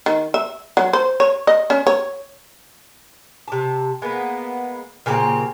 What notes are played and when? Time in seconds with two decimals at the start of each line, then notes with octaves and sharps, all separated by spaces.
0.06 D#3
0.34 E5
0.77 F#3
0.93 C5
1.20 C#5
1.47 D#5
1.70 C#4
1.87 C#5
3.48 C3 A5
4.02 G#3 A#3 B3
5.06 A#2 C#3 C4 G4